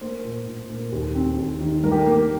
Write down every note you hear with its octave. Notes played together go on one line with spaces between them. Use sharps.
A#3 C5
A#2
A#2
A#3
D#2
C4
D#2
D#3
G2 A#4
G4
A#4
A#3